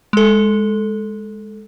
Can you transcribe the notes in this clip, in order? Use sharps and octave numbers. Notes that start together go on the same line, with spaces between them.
G#3 A4